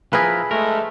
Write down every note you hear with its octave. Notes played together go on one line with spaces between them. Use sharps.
F3 E4 G#4 A#4 B4
G#3 A3 A#4